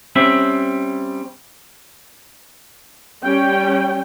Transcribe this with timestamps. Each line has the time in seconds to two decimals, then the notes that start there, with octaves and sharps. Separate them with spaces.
0.16 G3 C4 C#4 E5
3.23 G3 C#4 G5